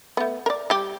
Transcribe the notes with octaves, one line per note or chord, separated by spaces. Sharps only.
A3 B3
A#4 D5
G3 G4